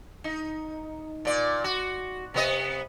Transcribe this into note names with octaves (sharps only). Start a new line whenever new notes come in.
D#4
A#2 D5
F#4
C3 B3 D#5